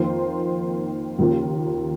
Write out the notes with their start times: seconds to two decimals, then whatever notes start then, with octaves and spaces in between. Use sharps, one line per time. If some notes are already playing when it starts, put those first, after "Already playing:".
Already playing: F2 D#3 A#3 F4 C5
1.19 D#2 C#3 F3 A#3 F4